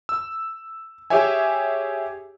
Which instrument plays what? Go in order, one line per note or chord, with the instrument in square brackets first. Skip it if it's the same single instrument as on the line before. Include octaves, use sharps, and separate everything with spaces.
[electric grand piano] E6
G4 G#4 C#5 E5 G#5